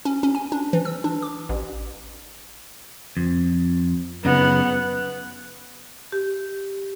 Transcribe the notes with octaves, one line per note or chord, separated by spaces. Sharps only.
C#4
C#4
G#5
D4
E3
E6
D4
D6
A1
F2
F#2 C#3 B3 D#4 F#5
G4